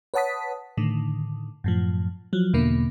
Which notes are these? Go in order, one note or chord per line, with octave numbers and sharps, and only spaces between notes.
B4 C#5 F#5 A5 D#6 B6
A2 D3 D#3
F#2 A2 F3
F3 F#3
E2 B2 D3 A#3